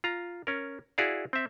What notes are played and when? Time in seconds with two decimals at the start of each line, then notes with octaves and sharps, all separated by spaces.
0.04 F4 A#5
0.47 C#4 A#4
0.98 E4 F#4 G#4 D5 F5
1.33 C4 E5